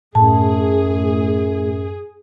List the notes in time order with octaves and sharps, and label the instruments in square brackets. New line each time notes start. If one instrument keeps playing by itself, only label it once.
[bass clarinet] F#2 [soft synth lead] A2 [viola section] G#4 [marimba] A5